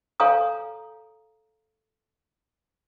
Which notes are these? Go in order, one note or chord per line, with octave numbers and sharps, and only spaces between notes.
A4 C#5 F5 G#5 A#5 D#6